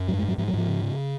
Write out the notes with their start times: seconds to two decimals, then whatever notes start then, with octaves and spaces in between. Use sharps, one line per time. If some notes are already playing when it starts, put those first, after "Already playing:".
Already playing: F#2
0.08 G#2 F#3
0.18 G#3
0.23 G#2
0.28 F#3
0.38 G#2 F3
0.48 F#3
0.54 G#2 F3
0.68 C#3
0.83 C#3